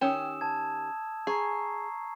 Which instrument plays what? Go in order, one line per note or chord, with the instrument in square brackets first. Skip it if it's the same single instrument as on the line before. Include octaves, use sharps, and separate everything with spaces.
[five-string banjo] D#3 C#4 G4 [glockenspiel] D#6 E6 E7
[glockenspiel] A5 G#6
[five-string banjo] G#4 [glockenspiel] A#5 C#6 C7